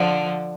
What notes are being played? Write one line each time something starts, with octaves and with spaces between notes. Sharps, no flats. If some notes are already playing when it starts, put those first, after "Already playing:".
Already playing: D3 F3